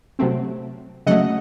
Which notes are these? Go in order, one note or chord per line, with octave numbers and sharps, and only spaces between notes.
C3 F#3 A3 C4
C#3 F#3 A3 D#5 F#5